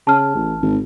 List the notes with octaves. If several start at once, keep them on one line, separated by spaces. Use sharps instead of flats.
C#3 A5 F6
A1
G#1